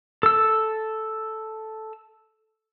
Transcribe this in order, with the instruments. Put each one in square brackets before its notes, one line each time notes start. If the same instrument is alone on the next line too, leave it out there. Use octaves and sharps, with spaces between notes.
[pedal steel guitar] A4 E6